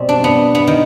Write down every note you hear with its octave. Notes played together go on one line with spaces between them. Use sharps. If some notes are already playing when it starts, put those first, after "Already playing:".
Already playing: B2 G3 C4
D4
B3
B3
D#3